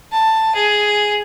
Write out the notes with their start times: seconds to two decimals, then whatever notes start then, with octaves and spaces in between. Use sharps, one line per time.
0.12 A5
0.55 G#4